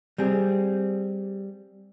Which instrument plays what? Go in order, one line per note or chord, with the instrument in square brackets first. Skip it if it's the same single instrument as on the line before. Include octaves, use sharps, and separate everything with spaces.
[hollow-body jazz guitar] G3 C4 G#4